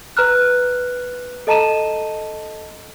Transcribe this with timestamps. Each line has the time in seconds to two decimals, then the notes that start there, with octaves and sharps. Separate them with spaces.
0.17 B4 A#5 F6 F#6
1.47 A4 D#5 A5 A#5 D#7 E7